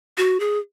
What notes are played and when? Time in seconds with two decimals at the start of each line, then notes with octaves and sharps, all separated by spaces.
0.18 F#4
0.40 G#4